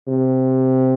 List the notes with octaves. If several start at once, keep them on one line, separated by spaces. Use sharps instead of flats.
C3